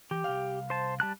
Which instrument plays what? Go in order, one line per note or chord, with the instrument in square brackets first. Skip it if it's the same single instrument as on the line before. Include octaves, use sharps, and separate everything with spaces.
[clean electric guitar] E3 [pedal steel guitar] G4
[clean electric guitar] C2 F5
[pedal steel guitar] C5 A5
G3 A5 F#6